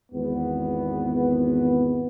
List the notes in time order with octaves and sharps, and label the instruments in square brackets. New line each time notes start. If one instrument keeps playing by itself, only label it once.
[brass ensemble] G#1 E2 B3